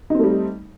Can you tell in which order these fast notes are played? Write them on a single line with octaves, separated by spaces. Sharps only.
D#4 C4 A3 G3